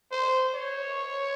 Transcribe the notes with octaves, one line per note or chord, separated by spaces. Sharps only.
C5
C#5